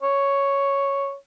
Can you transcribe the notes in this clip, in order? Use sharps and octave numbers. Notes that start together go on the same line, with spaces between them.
C#5